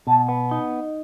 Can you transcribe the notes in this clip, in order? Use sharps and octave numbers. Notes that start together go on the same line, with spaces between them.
B2 A5
B3
D#4